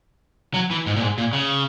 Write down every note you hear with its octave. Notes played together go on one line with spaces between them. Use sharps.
F#3
E3
G#2
A#2
G#2
A#2
C#3